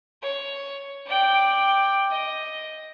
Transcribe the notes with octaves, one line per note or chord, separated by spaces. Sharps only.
C#5
D5 G5
D#5